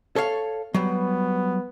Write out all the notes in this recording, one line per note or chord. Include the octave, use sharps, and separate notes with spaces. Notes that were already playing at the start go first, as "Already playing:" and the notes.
A4 C#5 F5
F#3 G3 B3